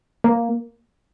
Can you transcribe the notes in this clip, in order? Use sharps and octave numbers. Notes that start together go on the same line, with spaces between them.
A#3